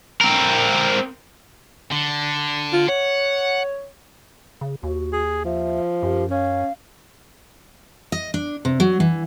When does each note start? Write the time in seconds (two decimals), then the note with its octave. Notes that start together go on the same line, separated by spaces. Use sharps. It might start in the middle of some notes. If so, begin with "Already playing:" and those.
0.21 C4 A#4
1.91 D3
2.72 F4
2.88 C#5 F#5
4.61 C#3
4.83 D#2 F#4
5.13 G#4
5.45 F3 E5
6.03 F#2 G4
6.31 C#4 F5
8.12 D#5
8.34 D4
8.65 C3
8.80 F#3
9.00 E3